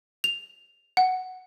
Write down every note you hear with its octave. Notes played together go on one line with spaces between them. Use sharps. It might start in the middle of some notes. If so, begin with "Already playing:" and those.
F7
F#5